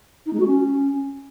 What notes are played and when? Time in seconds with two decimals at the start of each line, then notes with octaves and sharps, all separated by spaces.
0.26 D#4
0.33 G#3
0.40 F#4
0.46 C#4